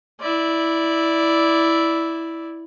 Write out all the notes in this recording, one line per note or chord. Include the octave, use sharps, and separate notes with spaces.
E4 D5